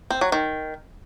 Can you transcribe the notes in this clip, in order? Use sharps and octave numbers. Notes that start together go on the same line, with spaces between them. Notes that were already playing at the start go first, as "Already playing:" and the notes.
C4
F#3
D#3